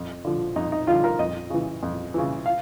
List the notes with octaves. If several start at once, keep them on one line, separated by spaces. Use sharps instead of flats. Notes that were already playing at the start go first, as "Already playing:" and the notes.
Already playing: F2
D3 F3
F2 D#4
D#4
D3 F3 F4
A#4
F2 D#5
C#3 E3
F2
C#3 E3
F5